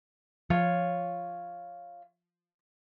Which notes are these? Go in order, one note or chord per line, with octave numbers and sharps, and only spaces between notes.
F3 F4 C#5